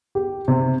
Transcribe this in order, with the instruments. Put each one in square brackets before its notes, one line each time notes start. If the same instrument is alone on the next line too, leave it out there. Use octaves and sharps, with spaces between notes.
[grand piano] G4
C3